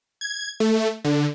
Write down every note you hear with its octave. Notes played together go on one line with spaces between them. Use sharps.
G#6
A3
D3